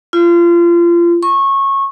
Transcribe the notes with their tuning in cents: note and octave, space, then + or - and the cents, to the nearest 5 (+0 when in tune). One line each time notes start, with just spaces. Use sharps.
F4 -30
C#6 -20